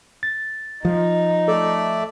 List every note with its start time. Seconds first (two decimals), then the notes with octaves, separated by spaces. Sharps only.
0.23 A6
0.85 F3 D#4
1.48 A3 A4 D5 E5